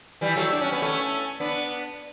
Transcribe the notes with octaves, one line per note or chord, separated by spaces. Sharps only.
E3 G3
F#3 A3
D4
C#4
B3
A3 C#4
B3 D4